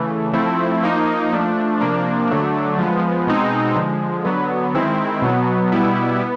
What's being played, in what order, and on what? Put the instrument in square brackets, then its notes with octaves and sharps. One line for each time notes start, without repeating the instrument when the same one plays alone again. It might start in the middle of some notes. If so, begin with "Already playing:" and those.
Already playing: [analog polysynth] C#3 E3 A3
F3 A3 C4 E4
F3 A#3 D#4
F3 A3 D4
C3 F3 A#3 D4
D3 F#3 A3 D4
F3 G#3 B3
B2 G#3 C4 D#4
D3 F3 G#3
D3 F#3 B3
D#3 G#3 C4 E4
B2 F#3 B3
B2 G3 B3 E4
B3